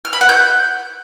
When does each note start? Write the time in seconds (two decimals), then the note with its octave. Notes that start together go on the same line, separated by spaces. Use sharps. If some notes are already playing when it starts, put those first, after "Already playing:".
0.05 F6
0.13 B5
0.21 F#5
0.29 G6